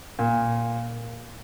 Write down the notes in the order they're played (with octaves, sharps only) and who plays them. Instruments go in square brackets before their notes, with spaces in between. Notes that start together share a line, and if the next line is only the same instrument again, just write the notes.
[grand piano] A#2